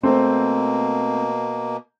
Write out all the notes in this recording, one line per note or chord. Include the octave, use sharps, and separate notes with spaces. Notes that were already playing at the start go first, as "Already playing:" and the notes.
B2 A3 A#3 C4 C5